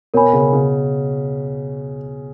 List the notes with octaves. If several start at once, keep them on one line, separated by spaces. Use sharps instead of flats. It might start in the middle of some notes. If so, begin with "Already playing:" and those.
B2 A#4 C#5 G#5 B5
C#3
C#3